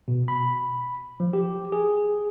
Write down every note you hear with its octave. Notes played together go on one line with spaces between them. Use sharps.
B2
B5
F3
G4
G#4